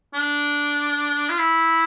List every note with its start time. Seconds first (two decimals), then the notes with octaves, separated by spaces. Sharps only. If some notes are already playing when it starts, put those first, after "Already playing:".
0.14 D4
1.29 F4
1.38 E4